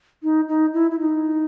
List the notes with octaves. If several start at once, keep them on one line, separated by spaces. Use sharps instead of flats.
D#4
D#4
E4
E4
D#4